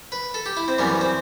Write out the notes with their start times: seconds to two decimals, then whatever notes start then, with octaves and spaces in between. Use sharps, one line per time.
0.12 B4
0.34 A4
0.46 G4
0.57 E4
0.68 C4
0.78 F#2 E3 G3 B3
1.01 C4